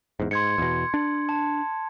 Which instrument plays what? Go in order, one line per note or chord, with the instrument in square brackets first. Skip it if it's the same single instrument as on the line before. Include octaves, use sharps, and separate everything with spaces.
[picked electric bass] E2 G#2
[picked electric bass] G#2 [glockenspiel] C6 G#6 C#7
[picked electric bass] E2 B2
D4
[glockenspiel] A5